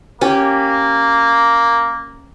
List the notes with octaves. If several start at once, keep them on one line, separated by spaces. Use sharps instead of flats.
A#3 C#4 G4